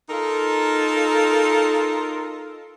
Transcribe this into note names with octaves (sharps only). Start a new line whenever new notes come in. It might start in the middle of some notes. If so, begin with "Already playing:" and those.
D#4 F4 A4 A#4